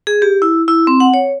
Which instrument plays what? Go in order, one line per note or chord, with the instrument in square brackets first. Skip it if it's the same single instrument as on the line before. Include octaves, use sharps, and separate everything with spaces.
[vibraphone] G#4
G4
E4
E4
C4
F#5
C#5